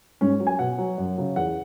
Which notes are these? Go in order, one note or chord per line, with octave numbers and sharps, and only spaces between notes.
G#2 C#4
F#3
G#5
B2 F#5
F#3
F#2
C#3 F#3
E2 F#5